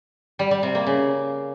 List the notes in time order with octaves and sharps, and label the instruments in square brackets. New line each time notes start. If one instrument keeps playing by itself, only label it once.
[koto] G3
G3
C3
A#3
C#3